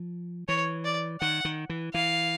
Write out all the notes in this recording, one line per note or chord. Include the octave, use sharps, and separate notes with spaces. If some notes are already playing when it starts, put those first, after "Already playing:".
Already playing: F3
E3 C#5
D5
D#3 F#5
D#3
E3
E3 F5